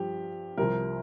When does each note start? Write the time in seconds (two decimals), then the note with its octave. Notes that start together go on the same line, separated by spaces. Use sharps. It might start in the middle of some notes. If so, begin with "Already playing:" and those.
Already playing: G2 F3 G4
0.57 C2 C3 F3 A#4